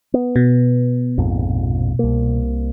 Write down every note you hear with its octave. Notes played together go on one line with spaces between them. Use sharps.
B3
B2
A#1 F2 G#2
C2 A#3